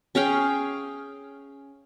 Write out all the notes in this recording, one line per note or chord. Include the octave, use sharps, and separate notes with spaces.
C#4 G#4 F5 G5